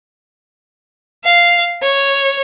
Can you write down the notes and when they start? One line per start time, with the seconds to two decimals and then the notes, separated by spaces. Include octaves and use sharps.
1.24 F5
1.82 C#5